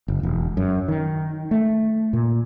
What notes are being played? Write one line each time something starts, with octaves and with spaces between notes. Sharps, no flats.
F#1
E1
F#2
D#3
A3
A#2